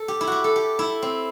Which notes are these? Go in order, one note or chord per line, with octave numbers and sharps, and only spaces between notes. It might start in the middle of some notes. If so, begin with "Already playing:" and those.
Already playing: A4
G4
E4
F#4 G4
A4
G4
E4
C4